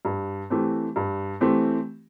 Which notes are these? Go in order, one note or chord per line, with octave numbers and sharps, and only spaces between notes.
G2
E3 A3 C4 G4
G2
E3 A3 C4 G4